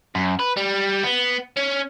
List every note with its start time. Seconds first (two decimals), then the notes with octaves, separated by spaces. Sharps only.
0.15 F#2
0.40 B4
0.57 G3
1.03 B3
1.57 C#4